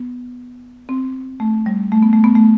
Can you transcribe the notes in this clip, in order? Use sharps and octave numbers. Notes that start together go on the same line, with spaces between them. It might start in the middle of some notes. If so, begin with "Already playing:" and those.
Already playing: B3
C4
A3
G3
A3
B3
A3
B3
A3